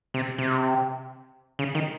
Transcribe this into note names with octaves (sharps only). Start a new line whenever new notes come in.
C3
C3
C#3
D#3